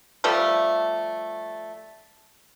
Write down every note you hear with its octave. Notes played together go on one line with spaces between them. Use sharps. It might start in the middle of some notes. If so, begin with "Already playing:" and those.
F3 G3 A3 A4